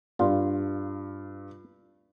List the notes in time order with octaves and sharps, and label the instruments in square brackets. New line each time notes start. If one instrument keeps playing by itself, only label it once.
[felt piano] G2 [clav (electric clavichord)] F4